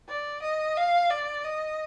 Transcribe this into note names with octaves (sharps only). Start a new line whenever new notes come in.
D5
D#5
F5
D5
D#5